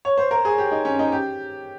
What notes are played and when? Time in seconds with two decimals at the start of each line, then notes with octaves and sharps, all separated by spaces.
0.05 C#5
0.18 C5
0.31 A#4
0.45 G#4
0.58 G4
0.71 D#4
0.85 C#4
0.99 D#4
1.12 G4